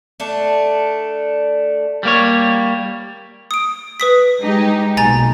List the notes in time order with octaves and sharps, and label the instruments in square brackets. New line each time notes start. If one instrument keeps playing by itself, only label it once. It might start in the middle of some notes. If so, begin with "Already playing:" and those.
[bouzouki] A3 D4
[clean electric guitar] G3 A#3 C#5
[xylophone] D#6 D7
B4 D#6 B6
[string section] G#3 D#4 G4
[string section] B1 A#2 [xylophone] G#5 A#5 A6